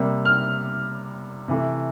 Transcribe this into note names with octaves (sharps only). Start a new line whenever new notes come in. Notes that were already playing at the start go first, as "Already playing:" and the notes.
Already playing: C3 G3 A#3
F6
C3 E3 A3